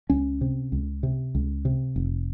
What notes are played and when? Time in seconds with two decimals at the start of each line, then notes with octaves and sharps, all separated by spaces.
0.10 C#2 C#4
0.41 C3
0.72 C#2
1.03 C3
1.35 C#2
1.65 C3
1.96 F1